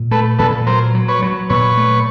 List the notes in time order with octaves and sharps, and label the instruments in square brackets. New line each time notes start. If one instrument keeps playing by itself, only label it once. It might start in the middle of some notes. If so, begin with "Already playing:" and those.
Already playing: [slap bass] A#2
[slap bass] A3 [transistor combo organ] A4 B4
[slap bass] A#2 [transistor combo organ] A4 B4
[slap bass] F#3 [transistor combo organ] A#4 C5
[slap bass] F#3
[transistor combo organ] B4 C#5
[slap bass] F#3
[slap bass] A#2 [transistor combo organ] B4 C#5
[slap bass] A3